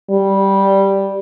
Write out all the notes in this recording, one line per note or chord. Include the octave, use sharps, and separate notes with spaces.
G3